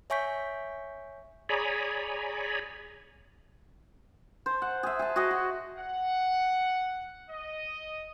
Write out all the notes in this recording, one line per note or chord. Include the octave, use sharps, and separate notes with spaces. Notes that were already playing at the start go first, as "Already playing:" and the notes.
C#5 E5 G#5 C#6 G6 B6
G#4 C#5 D5 G#5 A#5 B5
C5 A5
F#5
G#4 E5
G#4 A5
F#4 G#4 D#5
F#4
F#5
D#5